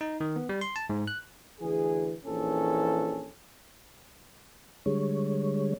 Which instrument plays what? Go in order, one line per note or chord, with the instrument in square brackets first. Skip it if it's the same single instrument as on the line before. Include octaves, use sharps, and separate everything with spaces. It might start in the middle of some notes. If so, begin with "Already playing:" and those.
[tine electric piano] D#4
D#3
B3
G3
C6
A5
G#2
F#6
[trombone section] D2 E3 G#4
A#1 E3 C#4 A4
[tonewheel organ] D3 G3 G#3 C#5